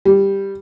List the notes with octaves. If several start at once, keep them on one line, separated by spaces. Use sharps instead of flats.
G3